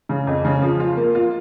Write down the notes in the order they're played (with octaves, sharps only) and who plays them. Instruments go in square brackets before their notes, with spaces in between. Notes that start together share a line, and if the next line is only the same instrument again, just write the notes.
[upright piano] C#3
F2
C#3
F3
F4
A#3
F4